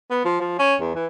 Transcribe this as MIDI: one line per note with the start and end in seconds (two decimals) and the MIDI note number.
0.11 0.23 59
0.25 0.39 53
0.40 0.57 53
0.59 0.75 61
0.81 0.92 40
0.95 1.07 52